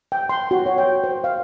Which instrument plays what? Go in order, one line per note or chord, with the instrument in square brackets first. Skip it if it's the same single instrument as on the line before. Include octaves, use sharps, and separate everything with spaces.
[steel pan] G5
C6
F#4
C#5
G5
C5
F5